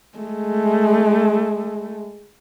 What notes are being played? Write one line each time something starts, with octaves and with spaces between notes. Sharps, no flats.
G#3 A3